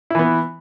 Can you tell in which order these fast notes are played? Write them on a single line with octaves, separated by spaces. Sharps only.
E4 E3 B3